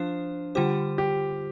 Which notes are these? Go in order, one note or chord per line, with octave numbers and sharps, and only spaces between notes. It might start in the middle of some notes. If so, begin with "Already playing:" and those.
Already playing: F3 D4 F4 C5
D3 G3 F4 G4 C5
G4